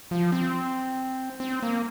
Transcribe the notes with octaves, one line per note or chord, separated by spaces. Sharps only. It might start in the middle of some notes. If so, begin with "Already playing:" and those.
F3
C4
C4
A#3